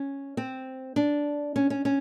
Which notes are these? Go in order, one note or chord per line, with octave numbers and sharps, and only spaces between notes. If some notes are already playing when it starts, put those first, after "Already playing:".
Already playing: C#4
C4
D4
C#4
C#4
C#4